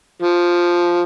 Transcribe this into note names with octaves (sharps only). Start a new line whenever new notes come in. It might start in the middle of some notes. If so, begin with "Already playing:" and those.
F3